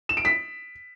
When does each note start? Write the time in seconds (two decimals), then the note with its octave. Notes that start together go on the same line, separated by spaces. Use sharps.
0.09 E7
0.17 D7
0.25 B6